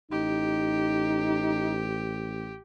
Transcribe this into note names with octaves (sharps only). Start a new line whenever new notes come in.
A1 D#4 G4